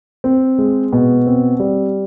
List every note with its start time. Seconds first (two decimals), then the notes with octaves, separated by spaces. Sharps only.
0.24 C4
0.58 G#3
0.93 B2
1.26 C4
1.60 G3